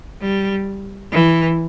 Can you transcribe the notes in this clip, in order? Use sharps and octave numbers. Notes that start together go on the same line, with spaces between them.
G3
E3